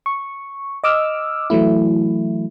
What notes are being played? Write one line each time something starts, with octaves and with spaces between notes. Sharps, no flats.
C#6
D#5 D6 E6 F6
E3 F#3 A3 E4